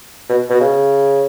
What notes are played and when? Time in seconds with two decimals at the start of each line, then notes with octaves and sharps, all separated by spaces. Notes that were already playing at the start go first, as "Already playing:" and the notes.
0.29 B2
0.50 B2
0.61 C#3